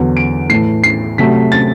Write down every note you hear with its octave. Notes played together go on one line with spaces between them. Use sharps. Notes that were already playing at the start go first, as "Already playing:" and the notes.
Already playing: E2 D3 F#3
D7
A2 E3 A3 C7
C7
C3 F#3 A3 B6
A6